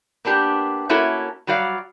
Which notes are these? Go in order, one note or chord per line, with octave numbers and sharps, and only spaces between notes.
A#3 B3 D4 G4
A3 A#3 C#4 E4 F#4 A4
F#3 G3 F#4 D5 F5